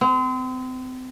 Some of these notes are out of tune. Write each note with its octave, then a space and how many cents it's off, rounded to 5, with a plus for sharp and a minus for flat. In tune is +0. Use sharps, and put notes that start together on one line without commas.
C4 -35